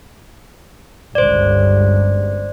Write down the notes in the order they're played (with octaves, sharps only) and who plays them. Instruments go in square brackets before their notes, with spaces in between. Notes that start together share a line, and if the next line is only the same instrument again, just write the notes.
[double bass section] G1 C#2 G2 [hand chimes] C5 D5